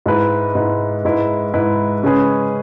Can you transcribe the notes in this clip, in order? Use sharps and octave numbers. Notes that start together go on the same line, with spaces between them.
G#2 G#3 E4 B4
G#2 G#3 E4 B4
G#2 G#3 E4 B4
G#2 G#3 E4 B4
C#3 G#3 C#4 G#4 B4